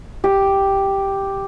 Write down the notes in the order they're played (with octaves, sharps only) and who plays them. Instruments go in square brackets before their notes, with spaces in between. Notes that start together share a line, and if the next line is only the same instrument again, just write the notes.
[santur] G4